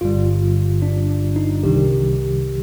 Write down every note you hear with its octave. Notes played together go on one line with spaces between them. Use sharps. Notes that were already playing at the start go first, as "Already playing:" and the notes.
G1 G2 D3 G3 F4
D4
D4
D#4
C2 C3 D#3 G3 G4